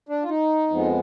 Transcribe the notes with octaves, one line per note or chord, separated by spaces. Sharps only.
D4
F4
D#4
F2 F3 G#3 B3